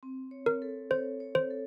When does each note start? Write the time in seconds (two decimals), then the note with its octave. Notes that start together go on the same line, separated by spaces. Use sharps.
0.03 C4
0.31 C#5
0.46 A#4
0.62 A4
0.91 C5 C#5
1.20 C#5
1.35 C5
1.50 A4